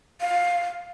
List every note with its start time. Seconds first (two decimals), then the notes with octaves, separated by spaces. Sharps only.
0.21 F5